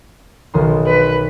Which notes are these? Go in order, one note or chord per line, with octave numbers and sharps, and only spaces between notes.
B1 D#3 C6
B4